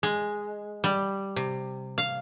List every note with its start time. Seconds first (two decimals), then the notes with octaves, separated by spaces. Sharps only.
0.03 G#3
0.84 G3
1.36 C3
1.98 F5